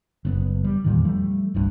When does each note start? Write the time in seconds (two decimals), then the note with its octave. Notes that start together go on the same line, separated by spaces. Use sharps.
0.25 F#1 C#3 B3
0.64 G3
0.84 E2 A#2 D#3
1.05 F3 G3 A3
1.54 F1 C2 G2